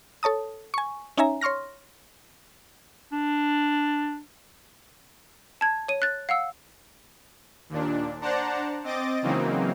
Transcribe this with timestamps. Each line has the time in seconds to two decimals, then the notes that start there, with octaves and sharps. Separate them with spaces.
0.23 A4 C#5 A5 D#6
0.74 G#5 C#6
1.17 C#4 D#4 C#5 E5 G#5 A#5
1.41 C#5 C6 C#6 F6 A#6
3.12 D4
5.61 A5 G#6
5.88 C#5 D#7
6.02 F#6 A6
6.29 F5 F#5 E6
7.69 D#2 A#2 D4
8.21 D4 C5 D5 F#5 A5 A#5
8.84 C4 D#5 D6 A6
9.22 C#3 E3 F#3 A#3 C4 D#4